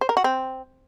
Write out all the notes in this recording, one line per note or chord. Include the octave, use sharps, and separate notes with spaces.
C5
A#4
F#4
C4